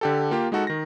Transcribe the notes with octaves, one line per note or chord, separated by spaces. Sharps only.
D3 G4 A4
A#3 F4 G4
G#3 D#4 F#4 A4
D#3 A#6